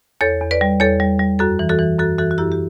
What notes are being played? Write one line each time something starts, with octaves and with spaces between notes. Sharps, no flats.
E2 A4 C#5
E2
B4 D5
G3
E2 A4 C#5
G3
G3
F#2 F#4 A4
E3
F#4 A4
E3
F#2 F#4 A4
E3 F#4 A4
F#4
F#2 E4 G4
G4